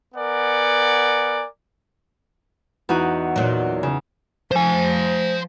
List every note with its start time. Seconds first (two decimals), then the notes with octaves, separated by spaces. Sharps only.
0.15 B3 A#4 D5 F#5 G#5
2.89 E2 D#4 F#4
3.36 A#2 F#3
3.83 C#3
4.51 F3 C5 G#5